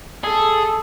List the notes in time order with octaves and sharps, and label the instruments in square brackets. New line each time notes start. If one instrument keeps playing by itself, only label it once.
[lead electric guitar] G#4 [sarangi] A4